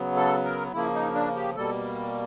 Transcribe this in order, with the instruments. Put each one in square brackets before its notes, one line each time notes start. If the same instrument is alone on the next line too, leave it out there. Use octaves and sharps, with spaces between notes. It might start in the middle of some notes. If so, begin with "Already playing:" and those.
Already playing: [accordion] C#3 F#3 B3
A4
A#4
C#3 F3 A#3 E4
D#4
D4
G4
B2 G3 A#3 A4